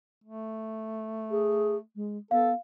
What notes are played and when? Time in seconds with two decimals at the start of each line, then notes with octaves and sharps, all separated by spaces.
0.24 A3
1.31 G#4
1.96 G#3
2.31 B3 A4 F5